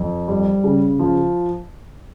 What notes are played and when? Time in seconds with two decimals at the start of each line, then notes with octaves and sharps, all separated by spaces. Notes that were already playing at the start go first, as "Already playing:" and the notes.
Already playing: F2
0.28 G3
0.64 C#3
0.99 F3